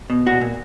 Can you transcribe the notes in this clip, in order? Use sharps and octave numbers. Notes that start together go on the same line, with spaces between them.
B2
A#2 F#4
A#2